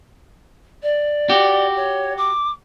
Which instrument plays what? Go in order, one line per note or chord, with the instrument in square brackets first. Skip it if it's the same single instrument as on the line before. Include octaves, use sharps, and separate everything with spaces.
[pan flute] D5
[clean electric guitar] F#4 G4
[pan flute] C#5
D6